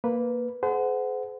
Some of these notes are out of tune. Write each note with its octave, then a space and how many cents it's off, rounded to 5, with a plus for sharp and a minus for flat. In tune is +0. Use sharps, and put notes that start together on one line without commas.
A#3 +0 B4 +0
G#4 +40 C5 -40 F#5 +0